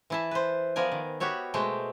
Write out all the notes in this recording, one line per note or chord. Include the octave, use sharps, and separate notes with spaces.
E3 E4 A5
B4 C5
F3 B3 A#4 D5 G#5
D#3
B3 F#4 G4 C#5 E5
B2 G#3 A3 C5 G5